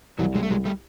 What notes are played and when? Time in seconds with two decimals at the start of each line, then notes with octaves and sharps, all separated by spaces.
0.18 C2 E3 F#3
0.35 C2 F#3 G#3
0.43 A3
0.50 C2 F#3 G#3
0.65 G3 A3